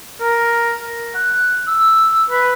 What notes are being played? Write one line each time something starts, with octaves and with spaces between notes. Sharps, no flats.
A#4
F#5
E6
B4